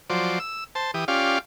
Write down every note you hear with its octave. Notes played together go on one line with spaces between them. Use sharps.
F3 F#3 C5 D5
E6
C5 A5
E3 G4 D#6
C#4 F4 G4 D5 F5